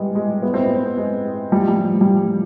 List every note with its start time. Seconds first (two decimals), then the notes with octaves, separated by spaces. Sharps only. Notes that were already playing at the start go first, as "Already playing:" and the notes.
Already playing: G3 G#3 B3
0.15 G#3
0.43 B3
0.54 C4
0.65 B3
0.97 G#3
1.52 G3
1.60 F3
1.68 G3
2.01 G3
2.06 F3